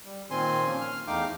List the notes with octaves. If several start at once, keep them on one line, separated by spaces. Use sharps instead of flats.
G3
A#2 D#3 C4 G#5 C6
F3 A#3 C#4
F6
E2 A3 D#4 F5 G5 D6